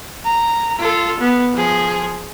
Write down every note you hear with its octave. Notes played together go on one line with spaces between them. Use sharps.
A#5
F4 A4
B3
F3 G#4